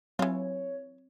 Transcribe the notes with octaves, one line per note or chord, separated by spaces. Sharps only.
E3 F#3 C4 F4 C#5